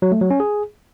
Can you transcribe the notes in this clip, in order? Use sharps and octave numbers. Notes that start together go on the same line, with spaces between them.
F#3
A3
F#3
C#4
G#4